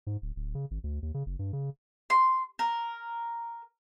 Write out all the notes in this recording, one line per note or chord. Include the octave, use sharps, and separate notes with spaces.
G#2
D1
D1
C#3
G#1
D2
D#2
C#3
F#1
G2
C#3
C6
A#4